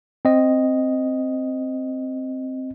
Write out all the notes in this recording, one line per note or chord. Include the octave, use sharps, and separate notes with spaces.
C4 D#5